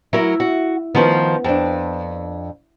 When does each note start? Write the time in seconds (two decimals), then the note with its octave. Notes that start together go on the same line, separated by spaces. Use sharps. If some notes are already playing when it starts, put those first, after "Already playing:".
0.13 F#3 E4 A#4
0.40 F#4
0.95 D#3 F3 B3 C#4
1.44 F2 D4